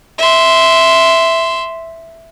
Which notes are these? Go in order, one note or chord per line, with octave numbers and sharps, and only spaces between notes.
E5 C6